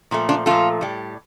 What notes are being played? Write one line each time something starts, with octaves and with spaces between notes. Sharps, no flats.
A#2 F3 A3
D4 F4
A#2 F3 A3 F4 A4
A2 G3